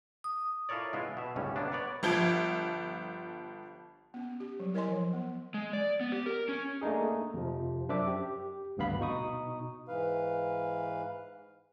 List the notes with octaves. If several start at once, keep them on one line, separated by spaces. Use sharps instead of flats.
D#6
E4 F4 A4 A#4 C#5 D5
G#3 B3 E4 F4
B2 E5
G1 C#2 A2 G3 C#4
C3 G#3 A#3 B3 D4
B3 C#5 D5
G1 F3 G#6 D7
B3 C#4
G4
F#3 G3
E4 A#4 C#5 D#5 G#5 C6
F3
B3
G#3
D5
B3
G4
A#4
C#4
A3 A#3 D4 D#4 G#4
F2 C3 F3
F#2 D4 C5 E5 D6
G4
G#1 D2 G2 B3 F5 B5
B2 D#4 C#6 D#6
G#2 E3 B4 F5